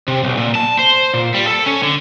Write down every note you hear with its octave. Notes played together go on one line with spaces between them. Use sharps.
C3
B1
A#2
A5
C5
A#2
G3
A4
C#4
D3